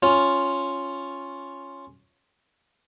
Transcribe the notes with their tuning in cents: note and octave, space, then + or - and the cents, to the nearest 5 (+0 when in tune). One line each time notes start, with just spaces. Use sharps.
C#4 +0 F4 +0